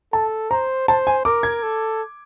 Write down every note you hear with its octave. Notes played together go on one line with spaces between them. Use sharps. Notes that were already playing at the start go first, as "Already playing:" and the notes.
A4 A5
C5 A#5
C5 A5
G#5
A#4 D6
G#6
A4